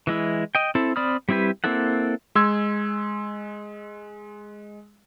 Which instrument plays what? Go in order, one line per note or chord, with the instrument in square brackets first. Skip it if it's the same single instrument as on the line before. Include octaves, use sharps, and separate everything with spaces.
[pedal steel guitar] E3 G#3 E4
D#5 G5
C4 E4 A4
C4 D5 B5 D#6 F6
G3 C4 E4 G4 B4
A#3 C4 E4 A4 F#5
[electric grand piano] G#3 C6 E6 G#6